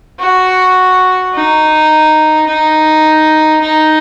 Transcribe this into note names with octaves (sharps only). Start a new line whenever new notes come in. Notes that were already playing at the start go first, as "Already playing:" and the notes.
F#4
D#4
D#4
D#4